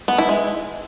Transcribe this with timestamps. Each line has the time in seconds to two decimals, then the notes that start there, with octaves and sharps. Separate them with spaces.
0.08 B3
0.18 E4
0.29 G#3